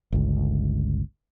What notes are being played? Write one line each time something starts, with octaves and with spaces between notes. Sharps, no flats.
G1 C#2